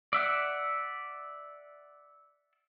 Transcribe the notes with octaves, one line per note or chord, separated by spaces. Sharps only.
D5 E5 F#5